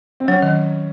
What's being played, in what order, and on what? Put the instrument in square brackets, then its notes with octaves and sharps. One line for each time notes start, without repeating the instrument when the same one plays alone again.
[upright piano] C4
[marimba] F#3 [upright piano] C#4
[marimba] D#3